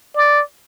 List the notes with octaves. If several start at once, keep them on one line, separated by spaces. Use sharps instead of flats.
D5